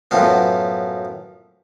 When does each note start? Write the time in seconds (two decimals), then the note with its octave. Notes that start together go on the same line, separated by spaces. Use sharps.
0.11 F#2 A2 F3 B3